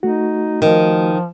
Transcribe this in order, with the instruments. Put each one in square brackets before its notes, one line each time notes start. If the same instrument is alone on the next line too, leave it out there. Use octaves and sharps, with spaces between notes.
[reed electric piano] A3 F#4 [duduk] D#4
[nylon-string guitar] D#3 [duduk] F3